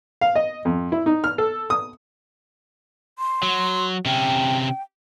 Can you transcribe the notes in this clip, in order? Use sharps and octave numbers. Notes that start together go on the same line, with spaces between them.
F5
D#5
F2
E4
D#4
F6
A4
D#6
C6
F#3
C3 C#4 G5